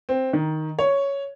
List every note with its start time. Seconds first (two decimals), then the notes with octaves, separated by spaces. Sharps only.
0.09 C4
0.33 D#3
0.79 C#5